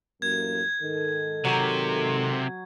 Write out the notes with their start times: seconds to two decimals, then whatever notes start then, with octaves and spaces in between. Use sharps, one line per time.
0.22 A1 F#2 A#3 G#6
0.82 G#2 D#3 A4
1.45 C3 F#3